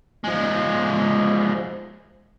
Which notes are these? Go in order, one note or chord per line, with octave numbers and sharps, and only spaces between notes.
F3 G#3